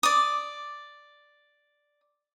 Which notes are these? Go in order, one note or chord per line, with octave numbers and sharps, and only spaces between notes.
D5 D#6